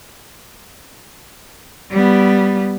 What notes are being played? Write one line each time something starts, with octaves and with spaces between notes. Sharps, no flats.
G3 B3